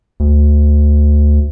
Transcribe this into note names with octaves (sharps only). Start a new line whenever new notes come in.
D2